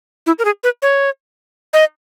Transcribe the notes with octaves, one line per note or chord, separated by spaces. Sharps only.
E4
A#4
G#4
B4
C#5
D#5